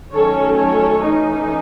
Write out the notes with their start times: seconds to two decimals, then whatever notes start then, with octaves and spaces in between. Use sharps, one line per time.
0.12 D#3 F#3 A3 C#4 A4 C#5
0.57 A4 C#5
1.02 E3 A3 C#4 D#4